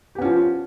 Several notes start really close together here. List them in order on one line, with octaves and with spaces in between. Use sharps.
G4 B3 C#4 F3